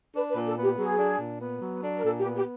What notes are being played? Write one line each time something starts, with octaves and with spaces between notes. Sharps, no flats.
D4 B4
B4
A#2
A4
B3
G4
F#3 G#4
D4
A#2
B3
F#3
D4
A#4
A#2 A4
G4
B3
G4